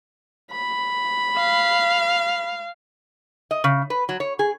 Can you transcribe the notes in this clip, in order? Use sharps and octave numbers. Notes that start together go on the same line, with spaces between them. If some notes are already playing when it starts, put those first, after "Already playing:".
B5
F5
D#5
C#3
B4
F#3
C#5
G#4